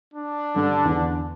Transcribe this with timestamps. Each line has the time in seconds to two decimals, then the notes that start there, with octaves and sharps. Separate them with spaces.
0.14 D4
0.56 G2 D3
0.85 E2